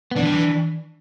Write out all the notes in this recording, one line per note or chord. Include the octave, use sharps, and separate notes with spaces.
B3
E3 D4
G3
E3